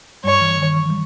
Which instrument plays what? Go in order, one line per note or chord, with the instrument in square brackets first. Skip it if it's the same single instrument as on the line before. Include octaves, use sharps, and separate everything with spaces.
[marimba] G2 G3 [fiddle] C#5
[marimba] E3
D#3
E3
E3
G3